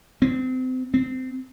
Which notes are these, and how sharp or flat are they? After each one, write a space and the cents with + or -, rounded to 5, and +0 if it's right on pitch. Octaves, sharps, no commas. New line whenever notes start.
C4 -30
C4 -20